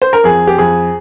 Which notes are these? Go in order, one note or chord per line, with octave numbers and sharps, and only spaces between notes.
C5
A#4
F2 G#4
G4
F2 G#4